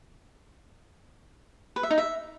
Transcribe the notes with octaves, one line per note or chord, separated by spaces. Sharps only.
B4
E5
D#4
E5